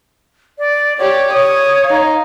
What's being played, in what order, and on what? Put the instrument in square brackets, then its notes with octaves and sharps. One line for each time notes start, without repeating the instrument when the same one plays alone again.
[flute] D5
[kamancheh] G4 D5 [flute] C#5
[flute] C#5 [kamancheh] D#6
[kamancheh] D#4 F5